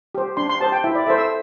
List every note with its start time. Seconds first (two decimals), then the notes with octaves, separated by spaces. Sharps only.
0.15 G4 C5
0.37 D4 C6
0.49 C6
0.60 G4 C5 A5
0.72 G5
0.84 E4 E5
0.95 D5
1.06 A4 C5 E5
1.18 E6